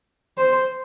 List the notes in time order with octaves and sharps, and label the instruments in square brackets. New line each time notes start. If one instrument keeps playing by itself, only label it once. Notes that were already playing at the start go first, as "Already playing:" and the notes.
[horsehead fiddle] C5